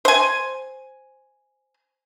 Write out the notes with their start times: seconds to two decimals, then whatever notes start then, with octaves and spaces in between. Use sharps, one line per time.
0.05 C5 G#5